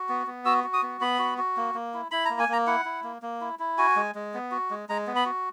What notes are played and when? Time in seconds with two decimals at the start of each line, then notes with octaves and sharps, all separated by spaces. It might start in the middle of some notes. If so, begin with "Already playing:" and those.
Already playing: F#4
0.09 B3
0.27 B3
0.45 F#4 E6
0.64 F#4
0.73 D#6
0.83 B3
1.01 B3 B5
1.19 F#4
1.38 F#4
1.57 A#3
1.74 A#3
1.94 E4
2.11 E4 B5
2.25 A#3 A#5
2.39 G#5
2.49 A#3 A#5
2.67 E4 F#5
2.85 E4
3.04 A#3
3.22 A#3
3.41 E4
3.59 E4
3.78 F#4 G#5
3.96 G#3
4.15 G#3
4.34 B3
4.51 F#4
4.71 G#3
4.89 G#3 A#5
5.07 B3
5.16 B5
5.26 F#4